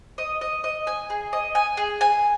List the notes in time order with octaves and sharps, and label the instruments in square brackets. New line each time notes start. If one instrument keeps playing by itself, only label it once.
[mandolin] D#5
D#5
D#5
G#5
G#4
D#5
G#5
G#4
G#5